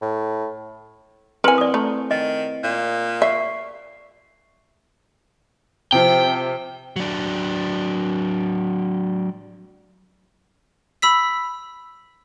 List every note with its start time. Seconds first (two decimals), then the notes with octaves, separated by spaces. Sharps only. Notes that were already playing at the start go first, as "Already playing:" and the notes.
0.02 A2
1.44 C4 E4 A#4 B4 G#5 C6 C#7
1.58 D5 D#6
1.74 A3 A#5
2.11 D#3 D#5
2.64 A#2
3.22 D5 E5 C#6 C7
5.92 C3 F3 G5
6.96 F#3 D4
11.02 B5 E6 B6